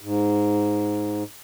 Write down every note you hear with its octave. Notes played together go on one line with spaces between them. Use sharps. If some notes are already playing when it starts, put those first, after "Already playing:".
G#2